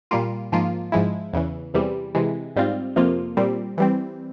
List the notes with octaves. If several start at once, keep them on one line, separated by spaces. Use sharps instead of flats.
A#2 G3 A#3 F4
G#2 F3 A#3 F4
G#2 F3 G#3 E4
E2 C#3 E3
E2 C3 E3 G3
C3 E3 G#3
G#2 G3 C4 F4
F2 C3 F3 A#3 F4
A#2 G3 C4
E3 G3 C4